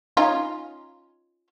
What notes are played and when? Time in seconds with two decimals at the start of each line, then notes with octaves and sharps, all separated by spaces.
0.17 C#4 D#4 F4